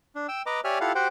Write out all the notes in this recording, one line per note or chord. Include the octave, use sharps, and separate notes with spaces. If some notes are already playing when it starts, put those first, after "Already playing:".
D4
G5 E6
B4 D#5 A#5 D6
G4 C#5 D5 E5 G#5 F6
E4 F4 G4 A4 F5 F#5
F#4 G4 C5 F#5 G5